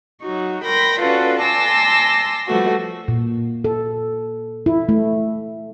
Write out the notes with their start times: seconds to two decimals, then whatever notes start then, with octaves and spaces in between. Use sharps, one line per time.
0.24 F#3 D#4 F#4
0.65 A#4 G5 B5 C6 A#6
1.00 C#4 F4 F#4 A4 B4 D5
1.42 G#5 A5 C6 D6 E6 A#6
2.47 F3 G3 A3 B3 F#4
3.08 A#2
3.64 A4
4.66 E4
4.89 A3